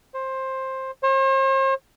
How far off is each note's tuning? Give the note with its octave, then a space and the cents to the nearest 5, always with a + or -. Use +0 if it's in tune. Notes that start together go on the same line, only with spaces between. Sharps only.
C5 +15
C5 +45